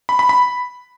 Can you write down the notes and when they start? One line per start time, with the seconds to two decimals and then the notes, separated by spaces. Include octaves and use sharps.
0.09 B5
0.19 B5
0.29 B5